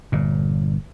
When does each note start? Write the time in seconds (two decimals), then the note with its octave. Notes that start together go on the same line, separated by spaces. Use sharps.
0.12 G1 A#2